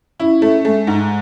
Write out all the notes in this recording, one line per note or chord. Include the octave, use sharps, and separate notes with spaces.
C#4 E4
A3
G#3 A3
G#2